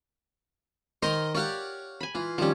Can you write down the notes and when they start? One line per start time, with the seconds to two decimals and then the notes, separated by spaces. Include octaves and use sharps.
1.02 D#3 A#4 C5 D#5 C6
1.35 G4 C#5 D5 F5 F#5
2.01 G#5 B5
2.15 E3 F4
2.38 D#3 F3 G3 C#4